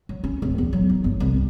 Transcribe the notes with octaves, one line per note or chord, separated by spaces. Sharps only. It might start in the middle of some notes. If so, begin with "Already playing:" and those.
F#3
C#4
D1
E2
F#3
D#4
G1
C2
G3